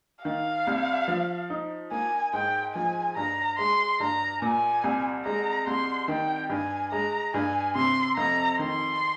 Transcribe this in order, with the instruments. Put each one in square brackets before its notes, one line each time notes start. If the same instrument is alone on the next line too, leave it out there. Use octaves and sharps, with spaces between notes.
[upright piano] D#3 [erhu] F5
[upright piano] C2
F3
D#4
[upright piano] A#3 [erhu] G#5
[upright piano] G#2 [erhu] G5
[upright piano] F3 [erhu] G#5
[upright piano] G2 [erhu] A#5
[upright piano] G#3 [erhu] C6
[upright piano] G2 [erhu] A#5
[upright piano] A#2 [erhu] G#5
[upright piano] C2
[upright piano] G#3 [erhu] A#5
[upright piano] C2 [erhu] C6
[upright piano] D#3 [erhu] G5
[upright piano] G2 [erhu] G#5
[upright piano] G#3 [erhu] A#5
[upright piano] G2 [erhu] G#5
[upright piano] C3 [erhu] C6
[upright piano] F2 [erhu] A#5
[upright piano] D#3 [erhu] C6